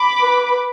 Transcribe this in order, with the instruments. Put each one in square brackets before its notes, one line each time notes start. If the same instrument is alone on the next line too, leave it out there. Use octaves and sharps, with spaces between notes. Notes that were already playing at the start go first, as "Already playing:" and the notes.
Already playing: [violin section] B5 D6
[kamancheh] B4